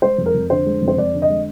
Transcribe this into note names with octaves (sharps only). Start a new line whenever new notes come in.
G#3 C5
F2
A#4
F2
D3 C5
G#3
F2
C5
F2 D5
D3
D#5
G#3